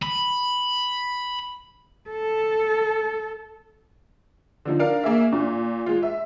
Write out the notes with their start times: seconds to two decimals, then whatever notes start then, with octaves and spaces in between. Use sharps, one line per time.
0.03 B5
2.10 A4
4.65 D3 F3 D#4
4.80 D4 A#4 F5
5.04 A#3 G#4 E5
5.32 A#2
5.86 G#3 F4
6.03 E5